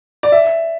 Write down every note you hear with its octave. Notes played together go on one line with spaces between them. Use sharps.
D5
E5